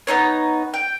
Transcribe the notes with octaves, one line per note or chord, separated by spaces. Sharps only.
B3 C#4 D#4 C#5
G5